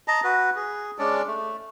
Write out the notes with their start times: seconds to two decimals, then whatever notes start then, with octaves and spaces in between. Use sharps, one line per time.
0.08 D#5 A5 A#5
0.24 F#4 B4
0.56 G#4
0.98 G#3 C#4 D4 D5
1.27 A3